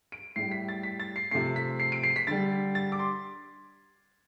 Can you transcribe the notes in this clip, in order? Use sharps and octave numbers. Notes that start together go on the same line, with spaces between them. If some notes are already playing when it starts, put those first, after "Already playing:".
D7
A2 G3 C7
B6
A6
B6
A6
C7
C3 F3 A3 C7
B6
C7
D7
C7
B6
D3 G3 A6
A6
D6
C6